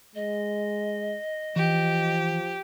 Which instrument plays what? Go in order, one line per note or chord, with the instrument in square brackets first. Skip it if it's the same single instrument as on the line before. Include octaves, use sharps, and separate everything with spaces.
[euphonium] G#3 [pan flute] D#5
[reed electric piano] E3 [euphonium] F3 [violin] G4